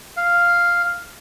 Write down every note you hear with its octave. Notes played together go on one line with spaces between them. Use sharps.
F5